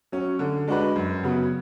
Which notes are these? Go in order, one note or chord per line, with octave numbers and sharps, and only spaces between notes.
F#3 C#4
D3
G#3 D4 F#4 B4
F#2
C#3 F#3 B3